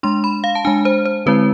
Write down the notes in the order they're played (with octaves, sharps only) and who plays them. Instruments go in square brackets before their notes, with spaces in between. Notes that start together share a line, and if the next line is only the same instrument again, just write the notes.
[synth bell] G#3 D4 C6
B5
F5
A5
G#3 D4 G#5
C5
C5
D3 G#3 C4 E4 B4